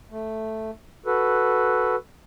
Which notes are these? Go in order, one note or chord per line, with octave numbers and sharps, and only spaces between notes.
A3
F#4 A4 B4